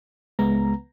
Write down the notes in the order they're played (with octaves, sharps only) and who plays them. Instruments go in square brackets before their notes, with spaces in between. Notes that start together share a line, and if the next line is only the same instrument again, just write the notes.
[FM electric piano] C#2 B3 A#5 [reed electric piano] G#3